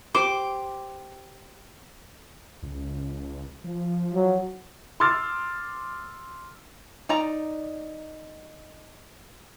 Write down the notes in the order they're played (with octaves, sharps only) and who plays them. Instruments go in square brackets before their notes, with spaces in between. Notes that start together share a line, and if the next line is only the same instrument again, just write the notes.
[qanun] G4 C5 [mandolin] D6
[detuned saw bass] C#2
F3
[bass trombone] F#3
[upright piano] C6 D6 E6 F6 A6
[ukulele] D#4 D5 A#5